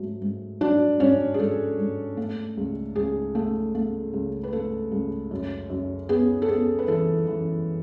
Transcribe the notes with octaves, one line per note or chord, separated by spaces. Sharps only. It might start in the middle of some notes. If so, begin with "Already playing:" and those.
Already playing: G#2 F#3 A3
G#2
F#3 D4 D5
G#2 C#4 C#5
G#4
G#2 A4
G#2
A3
C#2
C#2 G#4
A3
A3
C#2
B4
A3 A4
C#2
F#2
F#2
B3 G#4
A4
B3 G#4
B4
E3 A4
E3